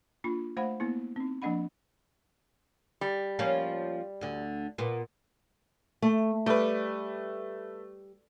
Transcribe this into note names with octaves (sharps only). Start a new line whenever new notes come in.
A#3 D4 F4 B5
A3 C5 F5 F#5 B5
A#3 B3 E4
C4 D#4
F3 A#3 D4 D#5 F#5 B5
G3
F3 A#3 C#4
D2 D3
A#2 B3
A3
G3 A3 B4